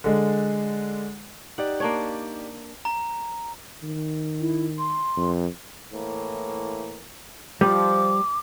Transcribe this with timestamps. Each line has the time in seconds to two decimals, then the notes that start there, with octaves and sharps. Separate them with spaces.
0.04 D3 G#3
1.58 D#4 G4 D5 F#5
1.80 A#3 D4 C#5
2.85 A#5
3.83 D#3
4.41 E4
4.79 C6
5.17 F2
5.92 A2 E3 A#3
7.61 F3 G3 D6